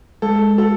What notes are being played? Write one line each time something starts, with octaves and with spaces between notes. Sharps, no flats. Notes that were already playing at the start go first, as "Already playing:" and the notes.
G#3 A4
F#4 A4